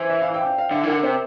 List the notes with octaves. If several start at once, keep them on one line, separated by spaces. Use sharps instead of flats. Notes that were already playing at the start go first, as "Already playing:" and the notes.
Already playing: E3 C5
E5
F5
G5
G5
F5
D3 E5
E3
D3 A#4
C3 C5